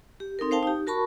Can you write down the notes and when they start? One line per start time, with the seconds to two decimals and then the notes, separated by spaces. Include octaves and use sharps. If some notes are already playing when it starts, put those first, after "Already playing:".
0.20 G4
0.39 C4 D#4 A4 A#4
0.51 C5 F5 G5 A5
0.63 D#4 G4
0.87 F#4 A#4 A5 B5 C#6